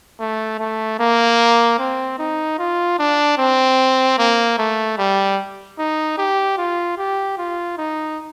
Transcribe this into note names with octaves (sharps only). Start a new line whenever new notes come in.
A3
A3
A#3
C4
D#4
F4
D4
C4
A#3
A3
G3
D#4
G4
F4
G4
F4
D#4